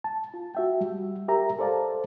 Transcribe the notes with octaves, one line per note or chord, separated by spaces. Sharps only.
A5
F4
F#4 E5 G5
G3
G4 A#4 E5 A#5
A4 C5 D5 F5 A5